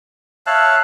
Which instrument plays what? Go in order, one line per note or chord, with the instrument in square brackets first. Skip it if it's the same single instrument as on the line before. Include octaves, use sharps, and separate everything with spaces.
[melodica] C#5 E5 F5 [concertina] A5 F#6